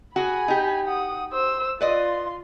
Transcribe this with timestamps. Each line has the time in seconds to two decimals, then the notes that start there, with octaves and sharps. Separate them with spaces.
0.16 F#4 G#4 G#5 B5
0.48 D#4 G4
0.86 F#5 D#6
1.32 C5 E6
1.81 F4 B4 D5 D#5 C6